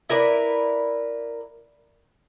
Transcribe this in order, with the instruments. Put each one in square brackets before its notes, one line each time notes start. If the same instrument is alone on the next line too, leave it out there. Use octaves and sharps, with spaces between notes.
[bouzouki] E4 A#4 B4 D5